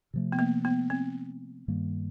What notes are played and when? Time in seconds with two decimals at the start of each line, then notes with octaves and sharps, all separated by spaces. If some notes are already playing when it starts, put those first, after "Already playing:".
0.14 C3 F3 A3
0.32 B3
0.39 A#3
0.65 B3
0.90 C4
1.68 G2 D#3 G3 A#3